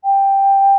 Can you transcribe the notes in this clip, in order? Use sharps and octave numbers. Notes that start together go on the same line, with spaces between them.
G5